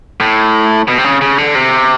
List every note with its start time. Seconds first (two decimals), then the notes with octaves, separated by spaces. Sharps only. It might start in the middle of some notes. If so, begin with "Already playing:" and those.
0.20 A2
0.88 B2
0.98 C3
1.04 C#3
1.21 C#3
1.38 D3
1.55 C3